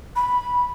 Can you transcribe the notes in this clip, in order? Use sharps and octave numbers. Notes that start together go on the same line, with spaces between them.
B5